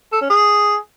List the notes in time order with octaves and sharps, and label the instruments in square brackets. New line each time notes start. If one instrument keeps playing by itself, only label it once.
[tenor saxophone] A4
C#4
G#4